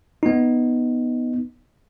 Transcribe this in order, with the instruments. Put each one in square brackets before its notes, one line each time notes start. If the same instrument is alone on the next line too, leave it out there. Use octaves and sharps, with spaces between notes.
[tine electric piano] B3 D#4